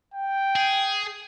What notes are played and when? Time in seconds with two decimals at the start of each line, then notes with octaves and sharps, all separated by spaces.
0.14 G5
0.56 G#4